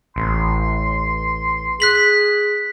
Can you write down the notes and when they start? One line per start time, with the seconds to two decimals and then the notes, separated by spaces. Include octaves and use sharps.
0.16 A1 C6
1.80 G#4 F#6 B6 F#7